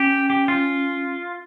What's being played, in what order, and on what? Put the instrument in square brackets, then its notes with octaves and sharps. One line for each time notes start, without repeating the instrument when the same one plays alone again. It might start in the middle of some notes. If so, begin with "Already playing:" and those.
Already playing: [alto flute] C#4 [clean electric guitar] G4
[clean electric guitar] G4
F4